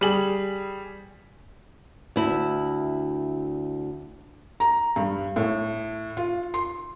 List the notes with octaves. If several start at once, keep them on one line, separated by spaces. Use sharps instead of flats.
G3 G#4 F#7
D2 E4
A#5
G2
A2
F4
C6